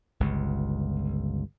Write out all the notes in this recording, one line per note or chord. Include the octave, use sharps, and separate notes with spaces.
G1 C#2